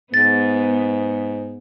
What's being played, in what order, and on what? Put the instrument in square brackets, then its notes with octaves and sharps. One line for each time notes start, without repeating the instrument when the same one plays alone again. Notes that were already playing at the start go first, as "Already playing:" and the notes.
[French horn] G#2 [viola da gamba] B3 [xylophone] A6